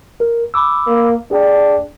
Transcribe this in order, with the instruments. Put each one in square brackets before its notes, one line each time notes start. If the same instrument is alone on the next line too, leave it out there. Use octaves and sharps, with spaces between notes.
[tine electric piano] A#4
B5 D6 E6
[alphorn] A#3
[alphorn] D4 [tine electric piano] G#4 G5 A5